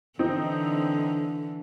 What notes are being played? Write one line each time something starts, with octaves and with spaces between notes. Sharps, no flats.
D3 E3 C4 D#4